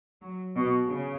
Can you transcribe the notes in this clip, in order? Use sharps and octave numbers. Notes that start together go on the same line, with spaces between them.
F#3
B2
C#3